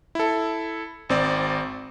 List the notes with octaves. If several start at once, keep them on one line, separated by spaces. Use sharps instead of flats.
E4 A4
G#1 C4 D5